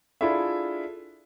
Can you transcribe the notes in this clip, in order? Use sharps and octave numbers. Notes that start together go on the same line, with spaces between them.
D4 E4 F4 G#4 A4 E5